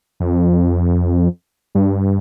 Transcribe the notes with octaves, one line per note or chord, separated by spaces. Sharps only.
F2
G2